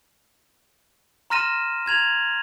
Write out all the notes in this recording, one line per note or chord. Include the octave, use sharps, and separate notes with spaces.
A#5 C6 F6 A#6 D#7 E7
A#5 G#6 F7 F#7